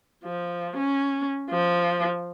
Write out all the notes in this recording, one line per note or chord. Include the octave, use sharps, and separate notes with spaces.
F3
C#4
F3